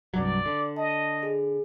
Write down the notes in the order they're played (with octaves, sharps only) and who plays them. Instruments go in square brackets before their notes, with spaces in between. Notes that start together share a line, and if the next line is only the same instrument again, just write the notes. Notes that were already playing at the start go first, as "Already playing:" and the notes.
[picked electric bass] C2 G2 F#3 [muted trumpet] D5
[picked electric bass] D3
[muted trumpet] D#5 [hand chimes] A5
[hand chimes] G#4